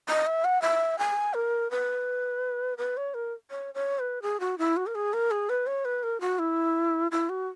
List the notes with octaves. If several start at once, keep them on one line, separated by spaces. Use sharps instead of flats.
D#5
E5
F#5
E5
G#5
A#4
B4
B4
C#5
A#4
C#5
C#5
B4
G#4
F#4
E4
F#4
A#4
G#4
A#4
G#4
B4
C#5
B4
A#4
F#4
E4
E4
F#4